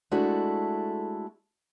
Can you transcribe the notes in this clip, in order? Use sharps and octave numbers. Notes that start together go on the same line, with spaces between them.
G#3 A3 D4 E4 F#4 A4